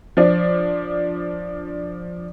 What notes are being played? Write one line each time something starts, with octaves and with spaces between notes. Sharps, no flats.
F3 D4